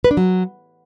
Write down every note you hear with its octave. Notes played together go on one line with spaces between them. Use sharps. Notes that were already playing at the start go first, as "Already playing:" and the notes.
B4
D4
F#3